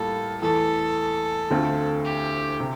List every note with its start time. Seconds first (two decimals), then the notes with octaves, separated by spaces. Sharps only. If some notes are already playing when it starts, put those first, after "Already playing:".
Already playing: A2 G3 A#3 F4 A4
0.42 E2 E3 A3 A4
1.50 D2 D3 A3 C4 F4
2.05 G4
2.60 C3